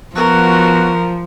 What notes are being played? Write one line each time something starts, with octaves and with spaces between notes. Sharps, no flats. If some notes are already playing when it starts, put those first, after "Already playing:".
F3 B3 F#4 A#4